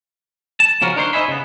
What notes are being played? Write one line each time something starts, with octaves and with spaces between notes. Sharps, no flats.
A5
C#3 F3 C#4 F#4 A#4
D4 D#4 A#4 C5 C#5 C6
D#4 C5 D#5 E5 G#5 B5
C#3 B3